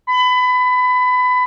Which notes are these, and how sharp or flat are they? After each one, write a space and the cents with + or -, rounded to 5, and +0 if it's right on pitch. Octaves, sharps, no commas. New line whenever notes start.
B5 +25